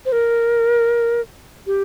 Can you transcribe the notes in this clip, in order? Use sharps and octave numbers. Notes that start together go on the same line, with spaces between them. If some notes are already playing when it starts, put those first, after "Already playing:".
C5
A#4
G4